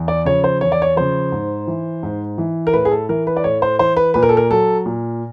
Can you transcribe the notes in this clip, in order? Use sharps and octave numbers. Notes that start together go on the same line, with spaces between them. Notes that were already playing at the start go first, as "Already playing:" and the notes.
Already playing: E2
D5
C#3 F3 C#5
C5
E2 C#5
D5
C#5
C#3 F3 C5
G#2
E3
G#2
E3
A#4
A2 B4
G#4
A4
E3 A#4
B4
D5
A2 C#5
C5
E3 C5
B4
A#2 B4
A#4
A4
A#4
F#3 A4
A#2